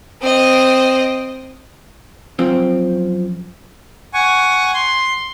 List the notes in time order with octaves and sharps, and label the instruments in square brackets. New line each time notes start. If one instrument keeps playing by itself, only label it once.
[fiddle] C4 D#5
[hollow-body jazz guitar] F#2 F3 C4
[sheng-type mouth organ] F#5 G#5 C#6
C6